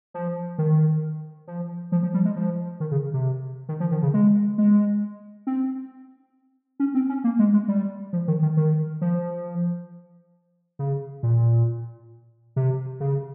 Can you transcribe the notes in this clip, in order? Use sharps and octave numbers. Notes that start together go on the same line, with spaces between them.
F3
D#3
F3
F3
F3
G3
G#3
F3
D#3
C#3
C3
D#3
F3
D#3
C#3
G#3
G#3
C4
C#4
C4
C#4
A#3
G#3
G#3
G3
F3
D#3
D#3
D#3
F3
C#3
A#2
C3
C#3